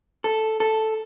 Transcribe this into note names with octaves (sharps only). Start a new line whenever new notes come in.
A4
A4